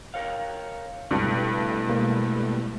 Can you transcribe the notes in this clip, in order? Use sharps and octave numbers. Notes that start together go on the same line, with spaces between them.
A#4 C#5 F5
C#2 G2 B2 G3 A3 E4 A4 B4
G#3 A#3 C5